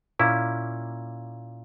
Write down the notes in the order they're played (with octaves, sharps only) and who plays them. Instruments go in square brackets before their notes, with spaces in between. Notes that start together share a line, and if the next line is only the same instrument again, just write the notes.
[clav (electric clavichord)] A#2 A#3 C#4 E4